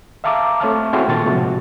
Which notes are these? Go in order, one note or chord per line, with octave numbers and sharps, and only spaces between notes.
E5 F5 A5 A#5 D6 E6
A3 C4 C#5 E5 A5 F6
C4 E4 F#4 G#4 A4 C5
A#2 D#3 A5 C#6 A6
A2 C3 F3 G#3 C4 F#4